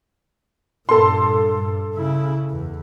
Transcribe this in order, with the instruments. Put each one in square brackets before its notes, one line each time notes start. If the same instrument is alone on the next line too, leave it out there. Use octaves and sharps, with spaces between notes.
[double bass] G2 A#2 [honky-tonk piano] A4 C6
[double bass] G2
C#3 E4
E2